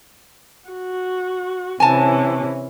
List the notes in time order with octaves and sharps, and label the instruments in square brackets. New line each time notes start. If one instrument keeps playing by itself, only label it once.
[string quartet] F#4
[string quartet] C3 E3 C#4 [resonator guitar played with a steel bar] G#5 A5